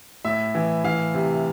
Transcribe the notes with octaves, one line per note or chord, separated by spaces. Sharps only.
A2 E5
E3
E3 F5
C3